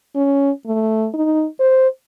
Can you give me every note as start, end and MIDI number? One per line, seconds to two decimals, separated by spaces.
0.16 0.51 61
0.66 1.07 57
1.14 1.46 63
1.60 1.88 72